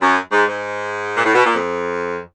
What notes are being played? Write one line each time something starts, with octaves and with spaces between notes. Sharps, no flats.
F#2
G#2
G#2
A#2
A2
B2
A#2
F2